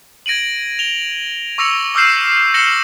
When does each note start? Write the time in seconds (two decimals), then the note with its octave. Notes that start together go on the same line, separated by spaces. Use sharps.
0.26 G#6 A#6 D7 D#7 F#7
0.79 F7 G7
1.58 C#6 D6 E6 A#6 C#7 F7
1.95 D6 E6 F6 G6 C7 E7
2.54 A#6 C7 C#7 E7 F#7 G7